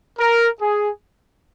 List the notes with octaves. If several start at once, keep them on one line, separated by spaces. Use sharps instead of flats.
A#4
G#4